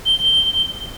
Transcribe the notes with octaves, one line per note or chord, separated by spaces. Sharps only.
G7